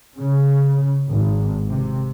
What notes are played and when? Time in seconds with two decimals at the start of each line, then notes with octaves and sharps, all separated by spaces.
0.18 C#3
1.09 G#1
1.69 C3